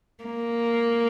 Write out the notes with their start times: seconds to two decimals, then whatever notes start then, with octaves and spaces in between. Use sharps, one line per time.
0.24 A#3